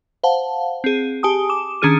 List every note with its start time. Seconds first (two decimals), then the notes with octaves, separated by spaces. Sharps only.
0.24 C5 F5 F#5 A5
0.84 C4 G#4
1.23 G4 G#5 A5 D#6
1.49 D6 E7
1.82 D#3 C#4 D4 G#4 F6 D#7